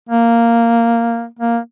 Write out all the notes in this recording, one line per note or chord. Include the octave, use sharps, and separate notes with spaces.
A#3
A#3